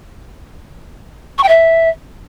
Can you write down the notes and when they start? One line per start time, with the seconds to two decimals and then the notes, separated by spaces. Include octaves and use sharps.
1.38 C#6
1.43 G5
1.48 E5